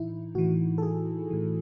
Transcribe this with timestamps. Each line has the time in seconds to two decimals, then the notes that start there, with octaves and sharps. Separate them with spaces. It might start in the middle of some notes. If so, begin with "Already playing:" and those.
Already playing: A2 E3 D#4 E4
0.35 A2 E3 F#4
0.78 A4
0.82 G#4
1.30 A2 E3